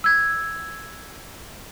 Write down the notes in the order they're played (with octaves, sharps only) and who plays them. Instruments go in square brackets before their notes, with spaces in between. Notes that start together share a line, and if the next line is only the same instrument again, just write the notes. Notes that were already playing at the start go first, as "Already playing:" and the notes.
[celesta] E6 G#6